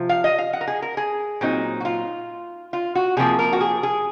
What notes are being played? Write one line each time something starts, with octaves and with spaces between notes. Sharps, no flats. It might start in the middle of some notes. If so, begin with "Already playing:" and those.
Already playing: C3 F3
F5
D#5
F5
F#5
A#4
G#4
A#4
G#4
A#2 F#3 C4 D#4
F#4
F4
F4
F#4
C3 F3 A#3 G#4
A#4
F#4
G#4
G#4